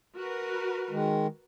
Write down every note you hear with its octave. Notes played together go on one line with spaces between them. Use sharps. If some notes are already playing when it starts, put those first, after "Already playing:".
F#4 A#4 B4
D#3 G#3